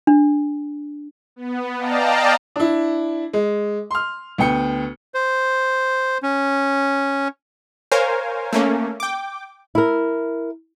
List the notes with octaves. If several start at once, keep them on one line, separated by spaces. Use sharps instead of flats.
D4
B3
D5 D#5 F5 G5 A5 A#5
D4 E4
G#3
C6 F6
D2 B3 G5 C#7
C5
C#4
A#4 C5 C#5 F5 G#5
A3 A#3 C#4
G5 D6
E4 A#4